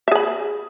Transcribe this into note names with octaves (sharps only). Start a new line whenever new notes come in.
G#4 E5 B5